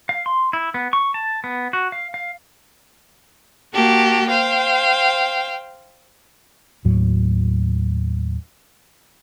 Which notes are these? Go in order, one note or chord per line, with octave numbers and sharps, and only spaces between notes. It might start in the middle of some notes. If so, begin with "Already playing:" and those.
F5
C6
E4
B3
C#6
A5
B3
F#4
F5
F5
A#3 F#4 G4 A5
C5 F5 G5
D#2 A2 F#3